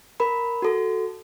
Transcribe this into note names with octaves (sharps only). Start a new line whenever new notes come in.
A#4 B5
F#4 A4